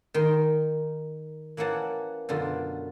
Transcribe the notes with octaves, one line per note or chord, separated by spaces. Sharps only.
D#3 A#4 C6
E3 A#3 C#4 F#5 A5
F#2 B2 D3 F4